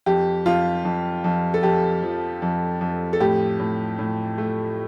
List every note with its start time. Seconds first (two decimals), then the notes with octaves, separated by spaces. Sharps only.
0.06 F2 G4
0.45 F2 F4
0.85 F2
1.24 F2
1.54 A4
1.63 F2 G4
2.03 F3
2.42 F2
2.81 F2
3.13 A4
3.20 A2 G4
3.60 A2
3.99 A2
4.38 A3